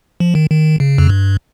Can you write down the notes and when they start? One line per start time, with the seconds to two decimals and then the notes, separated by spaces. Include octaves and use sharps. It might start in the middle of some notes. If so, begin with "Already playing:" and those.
0.20 F3
0.35 D#3
0.50 D#3
0.80 C#3
0.98 F2
1.09 G2